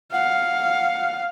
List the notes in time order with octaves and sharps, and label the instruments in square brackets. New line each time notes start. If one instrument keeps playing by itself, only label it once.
[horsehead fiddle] F5 [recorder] F#5